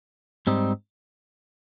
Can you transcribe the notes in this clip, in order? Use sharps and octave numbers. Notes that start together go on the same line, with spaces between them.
G#2 G3 C4 D#4